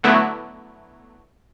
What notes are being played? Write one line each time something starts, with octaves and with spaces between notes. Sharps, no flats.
D3 F#3 A3 B3 E4